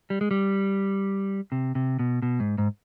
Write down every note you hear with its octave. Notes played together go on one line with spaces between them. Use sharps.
G3
G#3
G3
C3
C3
B2
B2
G#2
G#2